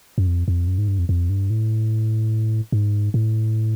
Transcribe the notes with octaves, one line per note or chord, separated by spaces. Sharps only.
F#2
F2
F2
F#2
G#2
G2
F2
F2
G2
A2
G#2
A2